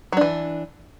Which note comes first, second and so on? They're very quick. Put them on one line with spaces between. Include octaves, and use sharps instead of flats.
F#3 D4 E3